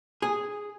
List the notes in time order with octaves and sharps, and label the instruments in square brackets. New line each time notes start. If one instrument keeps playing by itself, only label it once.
[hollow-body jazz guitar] G#4